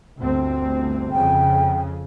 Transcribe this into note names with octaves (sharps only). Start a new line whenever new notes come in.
G1 D2 C4
F2 C#3 G5